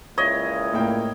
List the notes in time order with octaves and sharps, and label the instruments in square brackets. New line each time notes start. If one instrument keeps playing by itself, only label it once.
[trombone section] C#2 A#2 E4 [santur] C#5 D#5
[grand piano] A2 A#3 G5